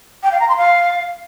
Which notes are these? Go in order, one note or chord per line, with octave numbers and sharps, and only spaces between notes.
G5
F5
A#5
C6
F5